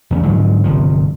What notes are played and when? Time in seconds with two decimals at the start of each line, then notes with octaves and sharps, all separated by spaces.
0.11 E2 C#3
0.23 G#2 D3 F3 F#3
0.64 G1 C3 F3